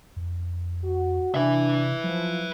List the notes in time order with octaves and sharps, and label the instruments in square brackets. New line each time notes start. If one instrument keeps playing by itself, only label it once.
[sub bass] F2
[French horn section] F#4
[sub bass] C3 [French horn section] D4 [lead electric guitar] B4 E5
[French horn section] F3 [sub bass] F#3